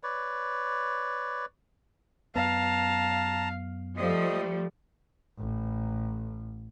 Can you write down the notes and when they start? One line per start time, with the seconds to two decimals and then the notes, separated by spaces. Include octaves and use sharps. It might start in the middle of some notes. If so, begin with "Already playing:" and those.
0.03 B4 C#5 D5
2.36 F#2 B3 F5 A5 A#5
3.97 F3 G3 A3 D#5
5.39 A1